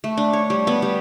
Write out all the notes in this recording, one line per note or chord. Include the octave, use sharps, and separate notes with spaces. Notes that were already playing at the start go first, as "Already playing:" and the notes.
A3
D4
C#5
G3
B3
G3